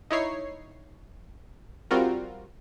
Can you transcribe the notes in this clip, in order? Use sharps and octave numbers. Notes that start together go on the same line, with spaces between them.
D#4 E4 C#5 C7
G3 C4 F4 F#4 A#4